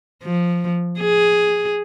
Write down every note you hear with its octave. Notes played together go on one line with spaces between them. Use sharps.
F3
G#4